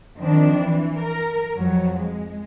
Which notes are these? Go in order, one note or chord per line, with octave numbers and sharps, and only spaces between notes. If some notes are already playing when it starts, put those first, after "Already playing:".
D#3 F3 C4 D4
E3
A#4
F2 F#3
G#3